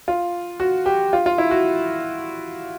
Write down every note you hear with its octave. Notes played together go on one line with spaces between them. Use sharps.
F4
F#4
G4
F4
F4
E4
F#4